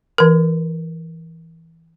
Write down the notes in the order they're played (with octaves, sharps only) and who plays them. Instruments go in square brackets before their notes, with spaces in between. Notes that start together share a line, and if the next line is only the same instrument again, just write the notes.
[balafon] E3 A#4